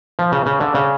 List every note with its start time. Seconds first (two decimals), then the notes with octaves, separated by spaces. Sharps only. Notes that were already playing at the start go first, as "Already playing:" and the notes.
0.19 F3
0.32 C#3
0.46 C#3
0.60 D3
0.75 C#3